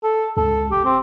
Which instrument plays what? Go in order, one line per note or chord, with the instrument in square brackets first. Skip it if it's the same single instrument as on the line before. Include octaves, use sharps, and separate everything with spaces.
[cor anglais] A4
[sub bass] C#2 [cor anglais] A4
[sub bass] E1 [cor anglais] G4
[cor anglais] C4